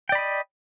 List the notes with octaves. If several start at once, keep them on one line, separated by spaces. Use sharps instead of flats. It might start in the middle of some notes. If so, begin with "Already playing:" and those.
D5 D#5 G5 B5